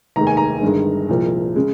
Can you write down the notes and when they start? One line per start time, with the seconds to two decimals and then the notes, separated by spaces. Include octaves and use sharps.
0.16 F1 D#2 D#3 G#3 A#5
0.27 G#5
0.37 A#5
0.62 G1 G2 D#3 G#3
1.09 C2 A#2 F3 G#3
1.56 C#3 G#3